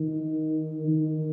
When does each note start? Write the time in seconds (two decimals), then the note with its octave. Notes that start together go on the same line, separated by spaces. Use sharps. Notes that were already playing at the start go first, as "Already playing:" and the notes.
Already playing: D#3
0.88 D#3